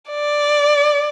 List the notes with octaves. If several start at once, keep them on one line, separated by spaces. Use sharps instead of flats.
D5